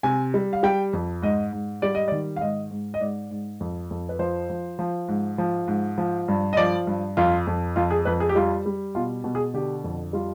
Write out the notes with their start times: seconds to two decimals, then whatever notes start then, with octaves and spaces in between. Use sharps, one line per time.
0.03 C3 G#5
0.34 G3
0.53 F5
0.63 G3 G5
0.93 F2
1.22 G#2 D#5
1.52 G#2
1.82 G3 D5
1.95 D#5
2.08 D#3 D5
2.36 F5
2.41 G#2 D#5
2.71 G#2
2.94 D#5
3.00 G#2 D5
3.31 G#2
3.60 F2
3.91 F2
4.09 B4
4.19 F3 C5
4.50 F3
4.79 F3
5.08 G#2
5.38 F3
5.68 G#2
5.98 F3
6.28 G2
6.53 D#5
6.57 F3 D5
6.87 G2
7.17 F2 F4
7.47 F2
7.76 F2 F4
7.91 G#4
8.05 F2 B4
8.20 G#4
8.29 G4
8.35 G3 F4
8.66 G3
8.95 B2 F4
9.24 B2
9.35 G#4
9.54 D3 G4
9.84 F2
10.13 G3 F4